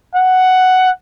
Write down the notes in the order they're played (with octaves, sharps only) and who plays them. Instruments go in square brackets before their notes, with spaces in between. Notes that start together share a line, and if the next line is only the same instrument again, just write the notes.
[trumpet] F#5